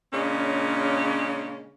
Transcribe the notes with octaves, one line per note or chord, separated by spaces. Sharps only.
A#2 C#3 G#3 C#4 D4